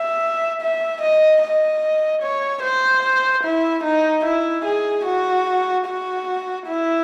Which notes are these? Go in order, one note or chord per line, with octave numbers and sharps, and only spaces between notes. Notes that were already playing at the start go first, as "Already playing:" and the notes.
Already playing: E5
E5
D#5
D#5
C#5
C5
E4
D#4
E4
G#4
F#4
F#4
E4